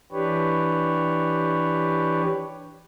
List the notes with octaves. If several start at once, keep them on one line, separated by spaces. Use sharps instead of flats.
E3 D4 G4 B4 C#5